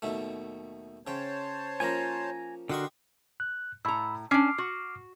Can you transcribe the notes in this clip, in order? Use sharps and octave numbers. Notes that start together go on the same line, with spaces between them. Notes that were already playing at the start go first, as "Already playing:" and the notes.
D#2 B2 A3
C#3 C5 C#5 G5 A5
F3 A#3 C#4 G#5 A#5
D3 F#4 G4 A#4 D#5 C6 C#6
F#6
A2 A#5 B5 E6
C#4 D4 D6 F6 C7
F#4